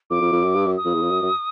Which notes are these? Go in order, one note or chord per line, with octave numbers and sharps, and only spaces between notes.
F2 D6
F2
F2
F#2
G2
F#2
D#6
F2
E2
F2
F#2
F#2